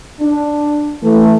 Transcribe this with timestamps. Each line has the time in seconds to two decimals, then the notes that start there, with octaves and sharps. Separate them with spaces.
0.21 D4
1.02 E3 A3